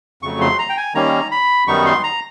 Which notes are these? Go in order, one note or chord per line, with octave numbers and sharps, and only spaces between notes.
F2 C#3 F#3 A3 C#6
C6
A#5
G5
G#5
D#3 G3 A#3 C#4 A#5
B5
F#2 D#3 G3 B3 D#4 C#6
C6
A#5